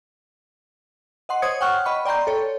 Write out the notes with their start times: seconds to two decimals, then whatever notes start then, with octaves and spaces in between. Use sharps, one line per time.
1.29 D#5 F#5 C6
1.42 C5 C#5 D#6 G#6 C#7
1.61 F#5 G5 C#6 F6 F#6
1.85 D#5 B5 C#6
2.05 D5 G5 A#5 C6 G6
2.27 A4 C#5